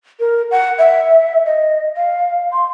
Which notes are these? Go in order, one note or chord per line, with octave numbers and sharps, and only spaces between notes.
A#4
F#5
E5
D#5
F5
C6